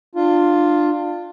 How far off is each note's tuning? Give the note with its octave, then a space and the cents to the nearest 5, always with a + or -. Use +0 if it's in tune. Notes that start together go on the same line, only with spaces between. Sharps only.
D4 +30 F4 +5